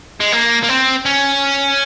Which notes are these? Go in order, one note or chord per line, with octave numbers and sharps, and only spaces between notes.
G#3
A#3
A#3
C4
C#4